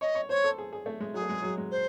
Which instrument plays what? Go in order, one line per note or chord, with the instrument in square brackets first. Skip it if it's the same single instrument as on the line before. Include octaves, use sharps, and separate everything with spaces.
[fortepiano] C#5 [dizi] D#5
[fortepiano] C#5
[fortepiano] C5 [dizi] C#5
[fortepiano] A4
G#4
G#4
A3
G#3
[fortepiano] F#3 [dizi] G#4
[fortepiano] A3
G#3
F#3
G#3
[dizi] C5